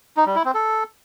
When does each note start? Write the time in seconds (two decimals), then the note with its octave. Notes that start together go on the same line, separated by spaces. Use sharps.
0.17 D#4
0.26 G3
0.36 E4
0.45 C4
0.54 A4